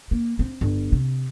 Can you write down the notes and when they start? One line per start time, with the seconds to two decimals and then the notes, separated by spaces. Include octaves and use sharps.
0.11 A#3
0.39 C4
0.61 G1
0.92 C3